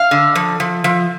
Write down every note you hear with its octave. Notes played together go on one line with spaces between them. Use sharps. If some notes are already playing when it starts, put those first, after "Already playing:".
Already playing: F5
D3
F3
F3
F3